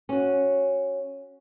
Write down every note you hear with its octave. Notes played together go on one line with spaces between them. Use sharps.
C#4 F#4